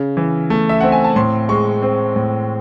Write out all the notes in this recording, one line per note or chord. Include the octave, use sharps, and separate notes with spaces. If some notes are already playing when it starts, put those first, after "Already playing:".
Already playing: C#3
E3
A3
E5
C4 F#5
G#5
A5
A2 C6
G#3 C#6
C4
A2